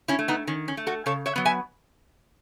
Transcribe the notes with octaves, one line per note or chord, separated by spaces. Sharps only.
C#4 E4
A3
B3 D#4
D#3 C#4
C#4
A3
F#4 A4
C#3 A4 C#5
C#5 E5
F#3 B3
E5 G#5